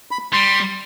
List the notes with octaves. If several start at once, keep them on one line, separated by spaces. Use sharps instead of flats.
B5
G3 C6